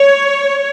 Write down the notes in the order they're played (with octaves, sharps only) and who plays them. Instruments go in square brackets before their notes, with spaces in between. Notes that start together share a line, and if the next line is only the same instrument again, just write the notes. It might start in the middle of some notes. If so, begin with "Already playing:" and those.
Already playing: [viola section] C#5